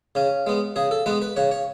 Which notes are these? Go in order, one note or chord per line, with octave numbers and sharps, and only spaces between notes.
C#3 C#4
G#3 B3
C#3 G#4
A4
G#3 B3 B4
B4
C#3 C#5
C#5